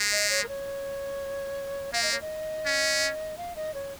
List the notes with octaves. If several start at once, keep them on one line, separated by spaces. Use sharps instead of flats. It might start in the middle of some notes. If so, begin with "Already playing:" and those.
Already playing: G#3
D#5
C#5
A#4
C#5
A#3 F5
D#5
C#5
D#5
C#4
F5
D#5
C#5